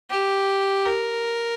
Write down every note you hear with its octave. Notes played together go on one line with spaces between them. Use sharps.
G4
A#4